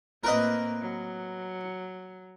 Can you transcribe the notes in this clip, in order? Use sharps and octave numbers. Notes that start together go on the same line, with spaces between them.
A2 A#3 C4 A#4 B4 D#5
F#3